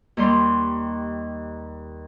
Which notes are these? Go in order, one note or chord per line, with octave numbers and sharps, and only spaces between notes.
D#2 G3 C6